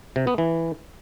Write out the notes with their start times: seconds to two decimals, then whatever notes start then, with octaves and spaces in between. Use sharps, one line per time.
0.16 C3
0.27 B3
0.38 E3